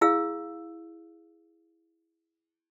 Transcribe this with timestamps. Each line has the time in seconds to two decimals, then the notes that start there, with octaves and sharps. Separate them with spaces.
0.01 E4 G#4 F5 E6